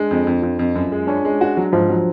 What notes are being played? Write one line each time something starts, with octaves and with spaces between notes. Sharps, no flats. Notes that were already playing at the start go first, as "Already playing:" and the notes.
Already playing: G#3 D4
F2
F2
F2 F4
F2
F#2
G#3
C#4 D4
G#3
F#4
F#3
G#2 F3
F#3